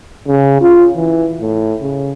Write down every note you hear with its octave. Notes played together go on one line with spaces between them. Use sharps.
C#3
F4
E3
A2
C#3